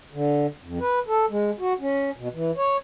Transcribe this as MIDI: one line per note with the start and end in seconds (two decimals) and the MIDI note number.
0.13 0.47 50
0.62 0.79 41
0.80 0.99 71
1.08 1.26 69
1.30 1.51 56
1.60 1.73 66
1.81 2.10 61
2.17 2.28 47
2.34 2.51 52
2.57 2.77 73